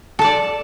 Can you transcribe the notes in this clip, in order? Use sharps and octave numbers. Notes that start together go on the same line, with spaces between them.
A4 D5 A5